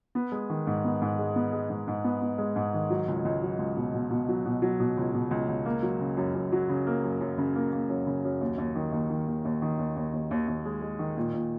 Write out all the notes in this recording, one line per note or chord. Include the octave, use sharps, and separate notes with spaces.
B3
G#3
D#3
G#2
B3
G#2
G#3
B3
G#3
G#2
G#2
B3
B3
G#3
G#2
D#3
F#3
C#2
C#2
F#3
C#2
B2
B2
B2
F#3
B2
F#3
B2
C#2
B2
C#2
C#2
A#3
F#3
C#3
F#2
F#2
F#3
C#3
A#3
F#2
F#2
C#3
A#3
A#3
F#2
C#3
F#2
D#2
D#2
D#3
D#2
D#3
D#2
D#2
D#3
D#2
D#2
D#2
D#2
D#2
G#3
G#3
D#3
A#2
A#2